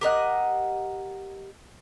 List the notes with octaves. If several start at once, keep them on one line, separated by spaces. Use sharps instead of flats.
G4 A#4 D#5 F#5